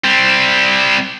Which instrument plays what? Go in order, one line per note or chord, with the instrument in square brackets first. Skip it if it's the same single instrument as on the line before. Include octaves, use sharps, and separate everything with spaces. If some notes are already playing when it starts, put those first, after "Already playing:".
[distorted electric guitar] G3 C4